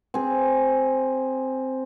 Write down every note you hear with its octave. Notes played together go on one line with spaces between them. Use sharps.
C4 G#4